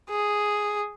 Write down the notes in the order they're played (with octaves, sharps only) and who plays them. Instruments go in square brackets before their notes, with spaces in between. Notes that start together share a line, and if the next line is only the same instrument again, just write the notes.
[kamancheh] G#4